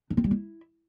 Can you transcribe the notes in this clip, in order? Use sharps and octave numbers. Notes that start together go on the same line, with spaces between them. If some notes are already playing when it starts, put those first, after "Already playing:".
D4
C4
G3
E4